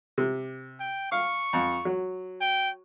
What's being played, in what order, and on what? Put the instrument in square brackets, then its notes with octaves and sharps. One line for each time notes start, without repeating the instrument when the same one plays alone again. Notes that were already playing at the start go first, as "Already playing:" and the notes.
[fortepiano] C3
[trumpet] G5
[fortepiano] F5 [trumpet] C#6
[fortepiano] F2
F#3
[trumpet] G5